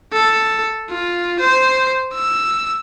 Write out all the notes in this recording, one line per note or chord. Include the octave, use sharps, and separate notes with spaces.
A4
F4
C5
E6